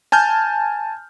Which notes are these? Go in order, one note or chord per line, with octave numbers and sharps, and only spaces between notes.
G#5 A5 F6 G6